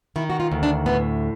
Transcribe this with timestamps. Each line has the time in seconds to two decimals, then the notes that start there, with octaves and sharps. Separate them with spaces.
0.16 D#3 E4
0.30 F#4
0.40 F4
0.52 D2
0.63 D4
0.86 A2 B3